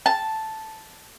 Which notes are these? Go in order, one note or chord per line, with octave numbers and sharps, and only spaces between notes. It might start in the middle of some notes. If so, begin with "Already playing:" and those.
A5